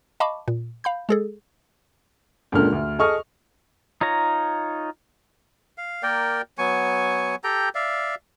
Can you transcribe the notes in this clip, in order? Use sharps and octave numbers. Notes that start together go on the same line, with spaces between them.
D#5 F5 A5 B5 C#6 D6
A#2
F5 B5 G6
G#3 G#4 A4
C#2 A#2 D3 A4 A#4 F6
D2
G#4 A4 D#5 C#6 D#6 F6
D#4 F4 C#5 A#5
F5
A#3 A#4 D5 G5
F#3 B3 G#5 C#6
G4 A4 G5 A#5
D5 E5 F5